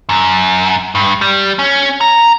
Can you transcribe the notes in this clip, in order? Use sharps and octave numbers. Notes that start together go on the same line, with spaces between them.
F#2
G2
G3
C#4
A#5